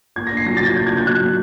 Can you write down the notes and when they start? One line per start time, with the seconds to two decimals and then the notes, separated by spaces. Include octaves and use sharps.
0.16 A#3 G#6
0.27 D4 A#6
0.37 C7
0.46 F#3 A#6
0.57 F#3 A6
0.67 G#6
0.77 A#3 G6
0.87 G#6
0.92 D4
0.97 G6
1.07 F#3 F#6
1.22 F#3